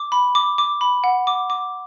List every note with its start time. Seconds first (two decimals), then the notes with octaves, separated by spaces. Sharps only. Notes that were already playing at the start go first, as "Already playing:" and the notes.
Already playing: D6
0.12 B5
0.35 D6
0.58 D6
0.81 B5
1.04 F#5
1.27 D6
1.50 D6